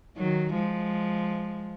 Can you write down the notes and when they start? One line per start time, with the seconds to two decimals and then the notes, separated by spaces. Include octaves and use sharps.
0.17 D#3 F#3
0.53 F3 G#3